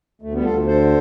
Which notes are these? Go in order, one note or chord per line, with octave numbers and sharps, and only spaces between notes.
D2 A3
G3 B3
D2 F4 A4
D3 A4 C5